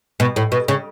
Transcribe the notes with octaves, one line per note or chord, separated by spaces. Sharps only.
B2
A2
B2
C#3